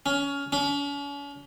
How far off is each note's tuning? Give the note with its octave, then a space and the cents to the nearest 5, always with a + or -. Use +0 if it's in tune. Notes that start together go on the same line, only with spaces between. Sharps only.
C#4 +20
C#4 +40